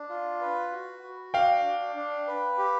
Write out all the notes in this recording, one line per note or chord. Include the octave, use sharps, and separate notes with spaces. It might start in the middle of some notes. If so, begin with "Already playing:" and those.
Already playing: D4
F4
B4
F#4
F#4
D4 F5 G5
D4
D4
B4
G4